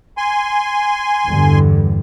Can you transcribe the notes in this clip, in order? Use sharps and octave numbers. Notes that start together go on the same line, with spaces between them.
G#5 C6
E2 G2 D3